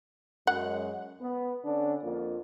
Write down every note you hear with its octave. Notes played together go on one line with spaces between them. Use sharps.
F#2 G#3 F#5
B3
D3 C#4 D4
F2 A#3 F4